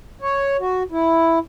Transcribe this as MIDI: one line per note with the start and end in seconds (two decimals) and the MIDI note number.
0.21 0.57 73
0.60 0.83 66
0.91 1.39 64